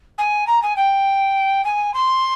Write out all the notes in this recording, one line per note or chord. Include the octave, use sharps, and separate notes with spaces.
G#5
A#5
G#5
G5
G#5
C6